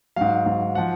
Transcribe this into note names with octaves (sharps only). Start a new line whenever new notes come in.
G#2 F#3 F5
G#2 F#3
F3 F#5